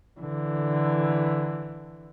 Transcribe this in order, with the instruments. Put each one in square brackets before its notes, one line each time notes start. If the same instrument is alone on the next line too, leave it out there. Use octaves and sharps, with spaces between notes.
[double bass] D3 E3